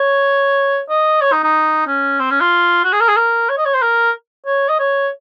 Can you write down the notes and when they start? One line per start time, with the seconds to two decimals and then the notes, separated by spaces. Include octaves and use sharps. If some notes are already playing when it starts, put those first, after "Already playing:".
Already playing: C#5
0.89 D#5
1.21 C#5
1.32 D#4
1.43 D#4
1.87 C#4
2.19 C4
2.30 C#4
2.41 F4
2.84 F#4
2.93 G#4
3.01 A#4
3.08 G#4
3.17 A#4
3.49 C#5
3.58 D#5
3.65 C#5
3.74 C5
3.82 A#4
4.46 C#5
4.68 D#5
4.79 C#5